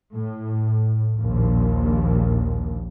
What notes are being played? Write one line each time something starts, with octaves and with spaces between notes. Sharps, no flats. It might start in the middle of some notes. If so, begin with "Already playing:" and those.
A2
A#1 D#2 A#2